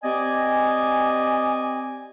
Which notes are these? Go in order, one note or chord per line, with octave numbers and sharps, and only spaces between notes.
C4 G4 D5 D#5 G#5